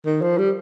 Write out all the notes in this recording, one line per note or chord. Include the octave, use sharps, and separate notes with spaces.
D#3
F3
G3